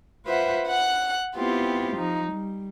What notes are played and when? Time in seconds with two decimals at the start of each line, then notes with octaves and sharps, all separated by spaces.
0.25 F4 B4 C5 E5 F#5
0.68 F#5 F#6
1.36 B3 C4 E4 F4 G4
1.96 F3 D#4
2.31 G3